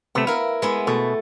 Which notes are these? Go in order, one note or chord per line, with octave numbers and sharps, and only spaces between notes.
C3 A3 B3
E4 A#4 F5
G#3 B3 E4
B2 A3